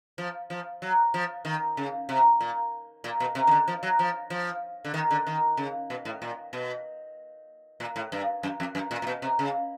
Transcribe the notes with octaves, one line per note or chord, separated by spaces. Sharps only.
F3
F3
F#3
F3
D#3
C#3
C3
A#2
A#2
B2
C3
D#3
D3
F3
F#3
F3
F3
D3
D#3
D3
D#3
C#3
B2
A2
A#2
B2
A#2
A2
G2
F#2
F2
F#2
A#2
A#2
B2
C3
C#3